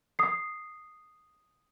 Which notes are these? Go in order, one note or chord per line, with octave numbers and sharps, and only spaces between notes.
D#6 C7